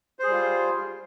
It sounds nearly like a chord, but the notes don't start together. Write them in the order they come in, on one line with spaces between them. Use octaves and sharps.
C5 G#4 G3 F4